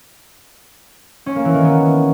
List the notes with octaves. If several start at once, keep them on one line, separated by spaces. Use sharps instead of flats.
C#4
A#3
E3
D#3
B3